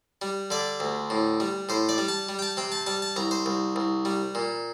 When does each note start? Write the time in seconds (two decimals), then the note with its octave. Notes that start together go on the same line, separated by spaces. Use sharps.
0.22 G3
0.50 D3 D5
0.80 D2
1.10 A2
1.40 G3
1.69 A2 C5
1.89 D5
1.98 G3
2.08 A5
2.29 G3
2.39 G5
2.42 A5
2.57 C3 G5
2.72 A5
2.86 G3 A5
3.02 A5
3.16 C2 A#5
3.31 C5
3.46 C2
3.76 C2
4.05 G3
4.35 A#2